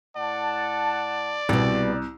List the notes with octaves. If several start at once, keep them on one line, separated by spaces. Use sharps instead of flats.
A2 D5 F#5 A5
C2 B2 G3